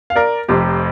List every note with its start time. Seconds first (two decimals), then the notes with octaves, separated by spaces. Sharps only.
0.10 F5
0.16 A#4 D5
0.48 F1 F2 C3 G4 C5